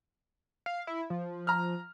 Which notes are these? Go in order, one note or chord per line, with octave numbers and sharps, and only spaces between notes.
F5
E4
F3
A#5 F6